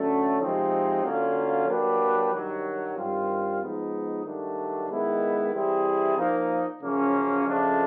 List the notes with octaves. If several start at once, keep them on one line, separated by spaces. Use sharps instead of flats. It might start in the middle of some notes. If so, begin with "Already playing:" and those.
Already playing: D3 F#3 A3 C#4
C3 F3 G#3 C4 D#4
D3 F#3 A#3 C#4 F4
F#3 A#3 D4 G4 B4
G2 D#3 F#3
G2 D#3 G3 C4 F4
F3 G#3 B3 D#4
G2 D#3 F#3 A3 D4
D#3 G#3 B3 E4
E3 G3 C4 E4 G#4
A#2 F3 A#3 D#4
F#2 C#3 F3 A#3 C#4
F2 C#3 F3 A3 D4